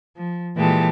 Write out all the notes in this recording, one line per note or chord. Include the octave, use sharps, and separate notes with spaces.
F3
A#2 E3 G#3 G4 A4